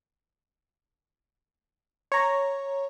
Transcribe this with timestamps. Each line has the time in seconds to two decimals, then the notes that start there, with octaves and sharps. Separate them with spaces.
2.12 C#5 A#5